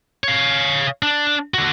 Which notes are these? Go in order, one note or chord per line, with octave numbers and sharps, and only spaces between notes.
C#5 F5
D4
D3 F#4